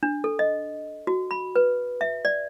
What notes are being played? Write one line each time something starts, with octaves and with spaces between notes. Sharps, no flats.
D4
A4
D#5
F#4
B5
B4
E5
D5